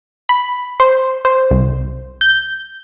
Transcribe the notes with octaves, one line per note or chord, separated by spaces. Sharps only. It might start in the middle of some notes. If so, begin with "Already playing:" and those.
B5
C5
C5
C2
G6